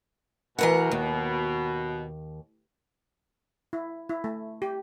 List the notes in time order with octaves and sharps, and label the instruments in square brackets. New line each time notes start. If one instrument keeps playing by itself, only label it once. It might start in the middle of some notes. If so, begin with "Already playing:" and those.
[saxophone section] B2 [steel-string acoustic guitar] E3 A#4 F#5
[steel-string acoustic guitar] D#2
[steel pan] E4
E4
A3
G4